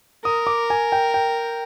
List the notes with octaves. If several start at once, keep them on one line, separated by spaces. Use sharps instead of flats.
A#4 D#6
D6
G#5
G5
G5